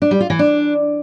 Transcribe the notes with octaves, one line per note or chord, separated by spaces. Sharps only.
D4
G3
F4
E3
D4